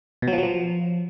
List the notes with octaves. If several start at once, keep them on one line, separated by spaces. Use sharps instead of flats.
B2
F#3
F3
F#3
F3